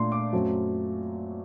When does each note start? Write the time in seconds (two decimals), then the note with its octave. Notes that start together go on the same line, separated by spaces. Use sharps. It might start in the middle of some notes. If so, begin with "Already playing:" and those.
Already playing: A#2 A3 D4 C6
0.12 D6
0.33 F#2 F#3 A3 C4